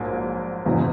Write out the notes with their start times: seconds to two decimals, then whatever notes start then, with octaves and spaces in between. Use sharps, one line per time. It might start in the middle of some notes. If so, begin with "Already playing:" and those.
Already playing: A#1 G#2 F#3 A#3
0.65 F#1 E2 B2